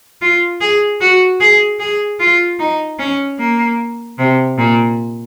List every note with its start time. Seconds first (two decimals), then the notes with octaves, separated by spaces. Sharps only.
0.22 F4
0.61 G#4
1.01 F#4
1.41 G#4
1.80 G#4
2.20 F4
2.59 D#4
2.99 C#4
3.40 A#3
4.18 C3
4.58 A#2